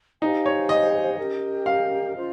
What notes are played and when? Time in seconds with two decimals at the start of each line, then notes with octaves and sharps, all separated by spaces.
0.21 D#4 G4 C5 F5 G#5
0.46 C#5
0.69 D#5
1.18 C#4 G4 A#4
1.66 F5
2.14 C#4 F4 C5